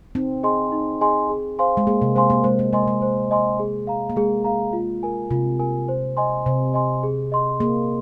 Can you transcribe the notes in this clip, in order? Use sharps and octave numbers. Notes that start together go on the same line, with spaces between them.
C4 D#4
G#4 D#5 G#5 C6
D#4
G#4 D#5 G#5 C6
G#4
C5 F5 G#5 C6
G#3
A#3 G#4
C3
G#3 C5 F5 G#5 C6
A#3
G#3 C5
A#3
G#3 D#5 G#5 C6
G#3
C5
D#5 G#5 C6
G#4
F5 A#5
A#3
G#3 G#4
F5 A#5
F4
A#4 G#5
C3 F4
A#4 G#5
C5
D#5 G#5 C6
C3 C5
D#5 G#5 C6
G#4
D#5 C6
A#3 G#4